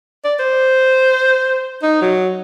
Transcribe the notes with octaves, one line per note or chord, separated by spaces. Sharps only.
D5
C5
D#4
F#3